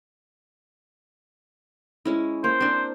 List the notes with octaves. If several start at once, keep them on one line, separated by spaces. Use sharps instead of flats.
G#3 C#4 E4
A#3 C5
C4 D4